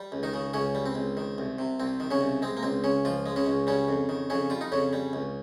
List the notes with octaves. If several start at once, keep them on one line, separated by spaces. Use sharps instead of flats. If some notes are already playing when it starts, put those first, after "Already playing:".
Already playing: G3
C#2
D#3 D#4
C#3
C#2 C#3 C#4
G3
C4
C#2
D#3
C2
C3
C2 C4
D#3
C#3 C#4
C2
G#3 C4
A#3
C#2 C4
C#3 C#4
C#2 F3 F4
G#3
C#3 C#4
C#2
C#3 G3 C#4
F2
D#3
F2 C#3 C#4
G3 F4
D#4
F2 C#3 C#4
G3
C#2